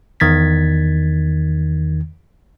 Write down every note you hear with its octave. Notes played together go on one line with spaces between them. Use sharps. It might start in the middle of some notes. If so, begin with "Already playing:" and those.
E2 D#3 G#6 A6 B6